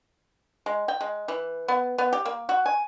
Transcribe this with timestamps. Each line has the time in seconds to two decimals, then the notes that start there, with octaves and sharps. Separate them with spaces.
0.66 G#3
0.88 G5
1.01 G#3
1.28 E3
1.68 B3
1.98 B3
2.13 G4
2.25 A#3
2.49 F#4
2.66 G#5